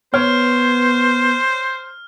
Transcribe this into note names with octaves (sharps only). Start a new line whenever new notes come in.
B3 C5 C#5 F6